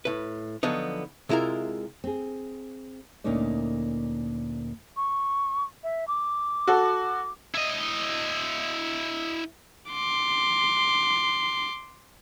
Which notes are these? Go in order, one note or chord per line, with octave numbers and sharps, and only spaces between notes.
A2 B4
D3 F3 F#3 B3 D#4
C3 G#3 E4 F4 A#4
C4 G#4
D2 A#2 A#3 C#4 D#4 D5
C#6
E5
D6
F#4 A4
E4 D#5
C6 D6